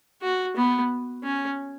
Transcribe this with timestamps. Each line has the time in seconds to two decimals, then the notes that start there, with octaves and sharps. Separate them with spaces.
0.22 F#4
0.56 B3
1.23 C#4